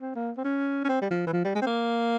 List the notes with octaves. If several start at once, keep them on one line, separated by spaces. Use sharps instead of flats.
C4
A#3
C4
C#4
C#4
C4
G3
F3
E3
F3
G3
G#3
C4
A#3